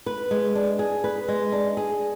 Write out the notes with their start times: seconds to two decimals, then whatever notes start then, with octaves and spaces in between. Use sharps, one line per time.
0.06 B4
0.31 G#3
0.55 D4
0.79 G#4
1.04 B4
1.28 G#3
1.52 D4
1.77 G#4